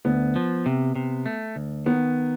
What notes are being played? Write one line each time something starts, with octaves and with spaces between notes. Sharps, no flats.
D2 B3
F3
C3
C3
A3
D2
D#3 B3